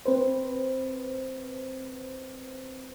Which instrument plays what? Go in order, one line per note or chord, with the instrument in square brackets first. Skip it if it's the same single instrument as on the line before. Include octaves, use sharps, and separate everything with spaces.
[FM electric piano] C4 B4 C5